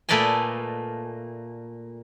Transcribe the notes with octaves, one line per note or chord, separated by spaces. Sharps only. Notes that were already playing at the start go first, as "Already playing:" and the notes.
A#2 A3 B4 D5 D#5 G#5